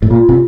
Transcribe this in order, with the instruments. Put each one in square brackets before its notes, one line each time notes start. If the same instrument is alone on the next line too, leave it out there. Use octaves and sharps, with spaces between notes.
[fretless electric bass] A2
[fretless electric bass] A#2 [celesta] F4
[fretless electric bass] C3